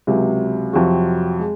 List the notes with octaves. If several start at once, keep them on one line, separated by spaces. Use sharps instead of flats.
C#2 C3 F#3
F2 C3 F#3 C4 F#4
G#3